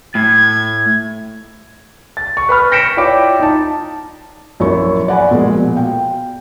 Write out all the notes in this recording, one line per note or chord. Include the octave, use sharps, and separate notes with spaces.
A2 G#6
A6
C#6
B4 B5 F6
G6 A#6 B6 C#7 D7 E7
E4 F4 C#5 D5 G5 D6
D#4 A5
A#1 F#2 A#3 E4 E5 C#6
D5 F#5 G#5 B5
A#2 F3 G#3
B2
F5 G5